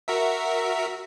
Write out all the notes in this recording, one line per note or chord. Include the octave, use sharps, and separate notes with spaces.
F#4 A#4 E5